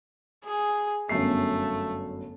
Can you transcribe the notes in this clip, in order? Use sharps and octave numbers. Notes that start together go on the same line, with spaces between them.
G#4
G1 F#2 A3 C7